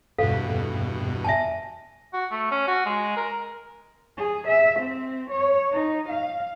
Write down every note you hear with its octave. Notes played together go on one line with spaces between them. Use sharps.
E2 G2 B2 A4 F5
E5 G#5 A5
F#4
A3
C#4
F#4
G#3
A#4
G#4
E5
C4
C#5
D#4
F5